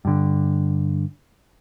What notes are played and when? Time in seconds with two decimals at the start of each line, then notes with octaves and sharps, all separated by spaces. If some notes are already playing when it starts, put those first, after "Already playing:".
0.05 G2 D3